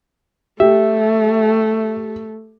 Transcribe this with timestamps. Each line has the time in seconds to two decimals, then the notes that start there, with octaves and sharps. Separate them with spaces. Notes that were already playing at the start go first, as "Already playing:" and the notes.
0.60 A3 G4 E5